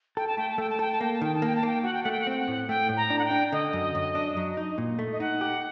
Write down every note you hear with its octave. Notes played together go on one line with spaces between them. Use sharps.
A4 G5
A5
A3 G5
A5
A3 G5
A5
A4 G5
A5
A#3 G5
A5
D#3 G5
A5
A#3 G5
A5
A#3 G5
F#4 F#5
G5
A3 F#5
G5
F#5
C4 G5
F#5
A2
A3 G5
A2
A#5
D4
F#5
G5
D4
D3 D#5
F#2
F#2
D4
F#3
D#4
A#2
A3
D#5
D#4 F#5
G4